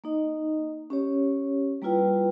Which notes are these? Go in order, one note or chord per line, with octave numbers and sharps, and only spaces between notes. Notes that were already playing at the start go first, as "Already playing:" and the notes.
A#3 D#4 D#5
C#4 G4 C#5
G3 A#3 E4 F4 B4 G5